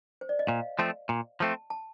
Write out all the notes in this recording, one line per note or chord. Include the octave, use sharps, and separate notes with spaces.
C5
D5
D#5
A#2 F5
F3 A3 C4
A#2
F3 A3 C4 A5
A5